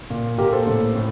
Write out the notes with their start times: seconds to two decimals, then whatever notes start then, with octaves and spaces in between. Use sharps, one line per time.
0.10 A#2
0.38 A#2 G4 A#4
0.53 A4 C5
0.67 A2
0.95 A2